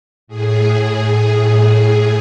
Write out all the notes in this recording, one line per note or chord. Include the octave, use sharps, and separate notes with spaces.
A2 G#4